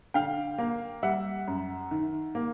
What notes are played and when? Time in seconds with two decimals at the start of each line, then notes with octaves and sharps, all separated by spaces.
0.14 D3 F5 G5
0.58 A#3
1.03 G3 E5 F#5
1.47 F#2
1.91 D#3
2.35 A#3